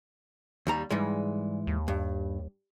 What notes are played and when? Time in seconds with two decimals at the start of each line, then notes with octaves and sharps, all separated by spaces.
0.67 D#2 G3 A#5
0.90 G#2 E3 G3 G#3
1.67 D#2
1.88 G2